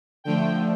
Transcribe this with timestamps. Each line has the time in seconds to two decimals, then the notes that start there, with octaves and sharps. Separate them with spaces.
0.24 D3 F3 A3 G5